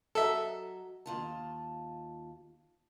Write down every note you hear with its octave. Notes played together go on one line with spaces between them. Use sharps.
F#3 A4 D#5 E5
D#2 F4 A5